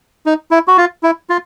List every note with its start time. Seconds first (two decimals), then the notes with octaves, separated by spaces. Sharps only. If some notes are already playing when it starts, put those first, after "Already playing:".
0.26 D#4
0.51 E4
0.68 F#4
0.77 F4
1.03 E4
1.30 F4